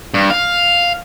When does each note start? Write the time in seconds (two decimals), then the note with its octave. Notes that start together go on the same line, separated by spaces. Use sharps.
0.14 G2
0.30 F5